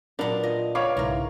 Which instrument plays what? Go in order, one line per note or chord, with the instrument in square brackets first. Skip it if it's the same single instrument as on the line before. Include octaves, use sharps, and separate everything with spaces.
[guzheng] A#2 B3 [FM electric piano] F#3 [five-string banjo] D4 A#4
[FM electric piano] F4 [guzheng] D#5
[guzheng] B3 [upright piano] C#5 F5 D6
[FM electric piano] B1 C#3 E4 [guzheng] G#2 A#4